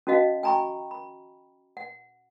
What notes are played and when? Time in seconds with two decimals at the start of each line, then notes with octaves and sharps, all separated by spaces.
0.07 C#4 D#4 F#4 D#5 F5
0.43 G5 G#5 A#5 B5 C#6
0.91 B5
1.77 F#5